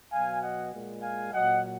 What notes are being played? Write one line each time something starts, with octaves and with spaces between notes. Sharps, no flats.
B2 F#3 F5 G#5
D#5 F#5
A#2 G#3
F5 G#5
A#2 F#3 D#5 F#5